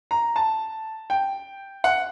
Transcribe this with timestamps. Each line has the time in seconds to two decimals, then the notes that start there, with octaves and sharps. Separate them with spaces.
0.11 A#5
0.36 A5
1.10 G5
1.84 F#5